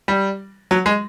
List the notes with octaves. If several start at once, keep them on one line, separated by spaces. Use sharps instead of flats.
G3
F#3
G#3